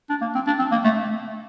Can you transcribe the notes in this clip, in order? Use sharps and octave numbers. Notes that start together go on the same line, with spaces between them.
D4
A#3
C4
D4
C4
A#3
A3